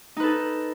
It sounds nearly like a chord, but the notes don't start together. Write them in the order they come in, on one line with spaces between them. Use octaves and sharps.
D#4 B4 A4